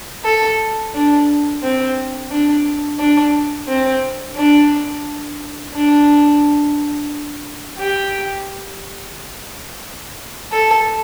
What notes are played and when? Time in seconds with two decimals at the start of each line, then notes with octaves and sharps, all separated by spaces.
0.25 A4
0.94 D4
1.63 C4
2.31 D4
2.99 D4
3.68 C4
4.36 D4
5.73 D4
7.78 G4
10.52 A4